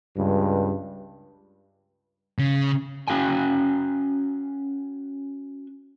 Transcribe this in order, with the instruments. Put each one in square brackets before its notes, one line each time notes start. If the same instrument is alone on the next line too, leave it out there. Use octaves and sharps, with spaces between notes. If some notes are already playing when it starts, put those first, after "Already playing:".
[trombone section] C#2 G2
[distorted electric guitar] C#3
[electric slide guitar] C#4 F#4 F5 G5 G#5